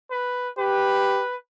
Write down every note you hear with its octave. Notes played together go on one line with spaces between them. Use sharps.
B4
G4 B4